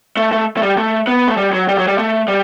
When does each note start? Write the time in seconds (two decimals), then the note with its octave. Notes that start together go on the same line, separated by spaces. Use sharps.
0.17 A3
0.32 A3
0.57 A3
0.63 G3
0.78 A3
1.07 B3
1.28 A3
1.37 G3
1.53 F#3
1.68 G3
1.78 F#3
1.88 G3
1.98 A3
2.28 G3